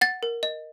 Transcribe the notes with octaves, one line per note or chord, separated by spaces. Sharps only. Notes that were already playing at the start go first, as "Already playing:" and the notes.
F#5 A6
A#4
D#5